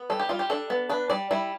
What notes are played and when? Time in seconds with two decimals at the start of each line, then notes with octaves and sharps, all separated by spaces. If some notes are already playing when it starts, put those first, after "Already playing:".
Already playing: B3
0.10 G3 A4
0.19 G4
0.29 G3 F4
0.39 G4
0.50 D4 A4
0.70 B3
0.89 D4 B4
1.10 G3 D5
1.31 G3 E4